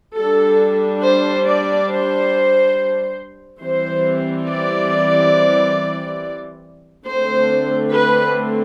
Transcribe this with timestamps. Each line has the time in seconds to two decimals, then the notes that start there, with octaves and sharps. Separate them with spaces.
0.17 G3 D4 A4
1.03 C5
1.47 D5
1.89 C5
3.62 E3 G3 C4 C5
4.48 D5
7.06 D3 A3 C4 C5
7.93 B4